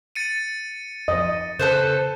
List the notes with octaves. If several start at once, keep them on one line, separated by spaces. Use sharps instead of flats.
A6 C#7 D#7
F2 D#5
C#3 A4 B4 C5